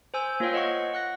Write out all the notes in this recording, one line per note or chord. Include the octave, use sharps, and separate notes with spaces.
C5 G#5 E6 G6
A#3 F4 C5 C#5 F5 G5
C5 D#5 F#5 G5 C#6
F#5 F#6 A#6